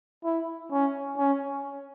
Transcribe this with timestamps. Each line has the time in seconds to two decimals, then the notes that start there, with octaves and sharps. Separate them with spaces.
0.24 E4
0.72 C#4
1.18 C#4